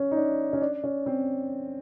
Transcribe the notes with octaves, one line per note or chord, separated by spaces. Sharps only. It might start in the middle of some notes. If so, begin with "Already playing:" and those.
Already playing: C#4
D#4
D4
C#4
D4
C#4
C4